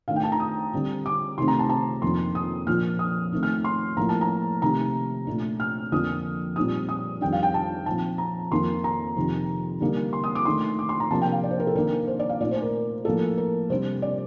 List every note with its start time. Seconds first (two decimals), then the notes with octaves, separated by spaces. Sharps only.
0.08 D#3 A3 D4 F5
0.16 G5
0.23 A5
0.32 A#5
0.40 D#6
0.73 D3 G3 C4
1.06 D6
1.38 C3 D#3 A3 C4 D#4 C6
1.48 A#5
1.59 A5
1.69 A5
2.02 F2 D#3 A#3 D4 C6
2.35 D#6
2.67 A#2 F3 A#3 D4 F6
2.99 D#6
3.32 D#3 A3 C4 D#4
3.43 F6
3.65 C6
3.97 A2 F3 A#3 A#5
4.09 A5
4.21 A#5
4.62 C3 D#3 A3 D#4 A#5
5.27 A#2 A3 D4
5.60 F6
5.91 F2 D3 F3 A#3 D4 D#6
6.56 A#2 G3 C4 D#4 D#6
6.89 D#6
7.21 F2 D#3 G3 D4 G5
7.32 F5
7.43 G5
7.54 A5
7.86 A#2 F3 C4 D#4 A5
8.18 A#5
8.51 F2 D#3 A#3 D#4 C6
8.84 A#5
9.16 F2 C3 D#3
9.80 D3 G3 A#3 D#4
10.13 C6
10.24 D#6
10.35 D6
10.45 D#3 A3 D4 C6
10.79 D6
10.89 C6
11.00 A#5
11.10 C3 F3 A#3 D4 A5
11.22 G5
11.32 F5
11.43 D5
11.51 C5
11.60 A#4
11.67 A4
11.75 D#3 A#3 D4 A#4
12.07 C5
12.19 D5
12.29 F5
12.41 A#2 A3 D#4 D5
12.51 C5
12.62 A#4
13.05 A2 F3 A#3 A4
13.38 A#4
13.70 C3 G3 D4 C5
14.02 D5